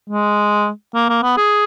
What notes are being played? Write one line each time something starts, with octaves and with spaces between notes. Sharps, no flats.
G#3
A#3
A#3
B3
G#4